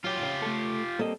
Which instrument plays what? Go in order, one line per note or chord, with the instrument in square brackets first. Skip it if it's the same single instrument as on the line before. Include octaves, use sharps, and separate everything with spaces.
[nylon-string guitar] F#3 [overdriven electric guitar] F4 G4
[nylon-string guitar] C#3 G5
[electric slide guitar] A3 A4
[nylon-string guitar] G3 A4 [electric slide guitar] A#3 C4 D#5